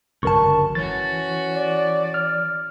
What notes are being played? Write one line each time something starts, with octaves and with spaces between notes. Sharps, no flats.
G1 C#2 F#2 A#4 A5 C#6
E3 C#4 F#4 A6
D5
F6